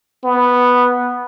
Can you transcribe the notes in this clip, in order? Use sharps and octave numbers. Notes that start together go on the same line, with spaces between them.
B3